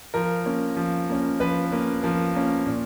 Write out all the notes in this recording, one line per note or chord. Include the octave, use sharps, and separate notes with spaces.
F3 A#4
A#3 C#4
F3
A#3 C#4
F3 B4
A#3 C#4
F3 A#4
A#3 C#4
A#2